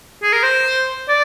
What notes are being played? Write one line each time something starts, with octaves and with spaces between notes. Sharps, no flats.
G#4
A#4
C5
D5